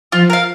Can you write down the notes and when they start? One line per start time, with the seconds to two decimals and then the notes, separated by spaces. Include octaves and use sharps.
0.12 F3 F4
0.30 A#4 F5